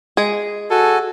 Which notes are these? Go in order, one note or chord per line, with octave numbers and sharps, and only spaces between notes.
G#3 G#4
F#4 A4 G#5